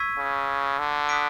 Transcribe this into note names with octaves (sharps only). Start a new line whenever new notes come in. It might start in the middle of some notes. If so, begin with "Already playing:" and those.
Already playing: C#6 E6 G#6 B6 D#7
C#3
D3
D#6 F#6 B6 D7